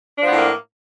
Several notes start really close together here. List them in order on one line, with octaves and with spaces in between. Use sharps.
D4 F3 B3 A2 A#3